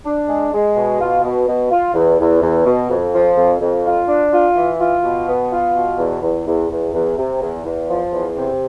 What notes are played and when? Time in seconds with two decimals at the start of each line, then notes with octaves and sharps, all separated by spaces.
0.05 D4
0.28 G#3
0.52 G#3
0.76 B2
1.00 F4
1.23 B2
1.48 B2
1.71 F4
1.94 E2
2.19 E2
2.42 E2
2.66 B2
2.90 F2
3.14 F3
3.37 F2
3.60 F2
3.85 F4
4.08 D4
4.32 F4
4.56 E3
4.79 F4
5.04 B2
5.27 B3
5.51 F4
5.75 B2
5.98 E2
6.22 E2
6.46 E2
6.70 E2
6.93 E2
7.18 C3
7.41 E2
7.65 E2
7.88 F3
8.12 E2
8.36 C3